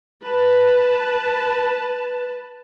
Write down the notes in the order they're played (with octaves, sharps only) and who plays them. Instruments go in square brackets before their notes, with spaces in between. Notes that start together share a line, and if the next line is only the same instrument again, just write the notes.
[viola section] B4 A5